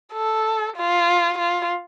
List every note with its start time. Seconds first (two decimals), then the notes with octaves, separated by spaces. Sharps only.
0.13 A4
0.76 F4
1.38 F4